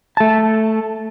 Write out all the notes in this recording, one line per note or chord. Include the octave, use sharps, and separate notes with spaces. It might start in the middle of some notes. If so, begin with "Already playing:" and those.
A3 A5